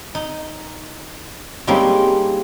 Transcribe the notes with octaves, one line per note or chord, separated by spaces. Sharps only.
D#4
G3 G#3 A#3 C4 C#4 D#4